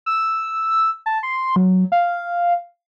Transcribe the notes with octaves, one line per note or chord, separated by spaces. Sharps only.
E6
A5
C6
F#3
F5